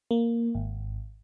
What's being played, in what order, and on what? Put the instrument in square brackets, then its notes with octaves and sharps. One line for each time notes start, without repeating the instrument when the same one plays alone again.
[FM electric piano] A#3
G#1